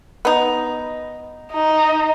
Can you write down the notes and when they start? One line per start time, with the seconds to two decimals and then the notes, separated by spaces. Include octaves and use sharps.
0.25 B3 D#4
1.52 D#4